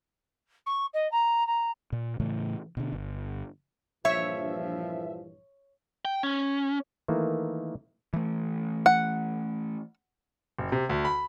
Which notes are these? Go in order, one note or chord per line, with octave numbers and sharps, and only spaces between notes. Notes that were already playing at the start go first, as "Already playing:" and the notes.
C#6
D#5
A#5
A#5
A#2
A2 C#3 E3 A3
B2 D3
G1
A#1 G2 E3 F3 C#5 E5
G5
C#4
D#3 E3 A3 A#3
E3 A3
F#5
F#1
C3
D2
B5